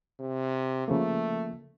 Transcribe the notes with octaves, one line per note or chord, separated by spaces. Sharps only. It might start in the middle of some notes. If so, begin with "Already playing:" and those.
C3
C#3 F3 A3 A#3